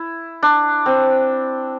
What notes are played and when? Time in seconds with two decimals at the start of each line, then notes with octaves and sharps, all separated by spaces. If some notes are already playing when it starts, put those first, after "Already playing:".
Already playing: E4
0.43 D4
0.86 C4